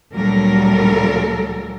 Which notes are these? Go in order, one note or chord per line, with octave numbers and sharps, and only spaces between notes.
D2 A#2 F#3 G3 A4 A#4